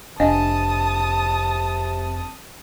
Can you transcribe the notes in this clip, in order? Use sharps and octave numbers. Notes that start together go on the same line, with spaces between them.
F1 C3 D4 D#5 F5 A5 D#6